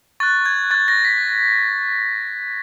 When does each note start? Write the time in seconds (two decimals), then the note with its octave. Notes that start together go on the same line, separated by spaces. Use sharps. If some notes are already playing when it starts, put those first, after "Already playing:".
0.20 C#6 F#6 A6
0.46 G#6
0.71 C#6 F#6 A6
0.88 A#6
1.05 B6